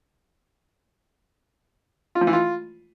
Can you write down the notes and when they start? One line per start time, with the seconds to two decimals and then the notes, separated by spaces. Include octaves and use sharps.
2.15 F4
2.21 F3
2.27 E3
2.33 F4